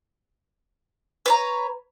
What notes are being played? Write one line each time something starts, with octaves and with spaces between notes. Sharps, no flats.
B4 C#5 A#5